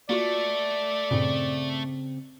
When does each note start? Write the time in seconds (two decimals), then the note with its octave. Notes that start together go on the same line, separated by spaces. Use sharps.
0.10 A3 A#3 F4 F#4 D5
1.11 G2 A#2 C#3 C4